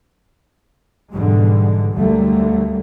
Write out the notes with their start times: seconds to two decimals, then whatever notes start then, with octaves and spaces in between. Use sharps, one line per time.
1.12 G#2 B2 D3 E3 G3 G#3
1.94 D2 D3 F#3 G3 A3 A#3